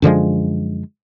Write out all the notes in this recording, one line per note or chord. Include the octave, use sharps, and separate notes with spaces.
F#2 D3 F3 G#3